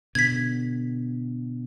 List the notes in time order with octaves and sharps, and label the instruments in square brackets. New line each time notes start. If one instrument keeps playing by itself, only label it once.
[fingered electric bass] B2 D3 [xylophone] G#6 B6